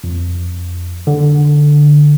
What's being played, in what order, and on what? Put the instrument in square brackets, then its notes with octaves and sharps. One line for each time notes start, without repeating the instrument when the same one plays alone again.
[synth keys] F2
D3